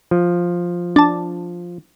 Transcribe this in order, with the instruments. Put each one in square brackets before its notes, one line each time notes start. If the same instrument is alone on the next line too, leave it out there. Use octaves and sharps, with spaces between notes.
[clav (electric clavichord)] F3
[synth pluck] D4 A5